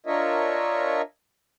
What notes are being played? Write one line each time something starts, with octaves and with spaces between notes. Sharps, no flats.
D4 F4 A#4 C#5 D#5 E5